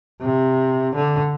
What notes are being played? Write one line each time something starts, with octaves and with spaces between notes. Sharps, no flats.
C3
D3